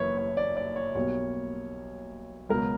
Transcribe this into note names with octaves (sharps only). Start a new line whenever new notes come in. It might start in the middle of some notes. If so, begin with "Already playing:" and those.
Already playing: F#1 F#2 E3 A#3 B4 C#5
C#5
D5
D5
C#5
B1 B2 G3 A#3 C#5
C#2 B2 F#3 A#4